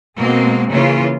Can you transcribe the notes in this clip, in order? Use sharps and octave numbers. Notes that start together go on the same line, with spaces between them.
B2 G#3 A#3 C4
C#3 E3 A#3 F4